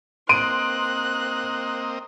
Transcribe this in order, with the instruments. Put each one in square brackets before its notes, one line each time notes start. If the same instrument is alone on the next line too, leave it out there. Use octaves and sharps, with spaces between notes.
[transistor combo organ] A#3 C4 D#5 [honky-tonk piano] C6 [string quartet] F#6 [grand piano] D7 D#7